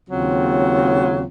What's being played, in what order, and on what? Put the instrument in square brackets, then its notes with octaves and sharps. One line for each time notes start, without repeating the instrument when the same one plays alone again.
[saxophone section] D#2 C#3 F#3 C4 F4